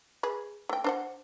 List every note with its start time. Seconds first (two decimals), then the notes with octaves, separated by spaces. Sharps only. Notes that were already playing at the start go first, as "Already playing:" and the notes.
0.23 G#4 B4
0.69 A3 G5
0.84 D4 C5 F#5